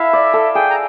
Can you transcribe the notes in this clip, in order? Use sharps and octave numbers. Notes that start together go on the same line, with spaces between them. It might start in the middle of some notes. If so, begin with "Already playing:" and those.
Already playing: E4 A4 E5 F5
D5
A4
G#4 G5
A#5